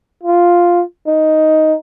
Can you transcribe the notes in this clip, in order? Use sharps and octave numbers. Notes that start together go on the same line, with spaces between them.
F4
D#4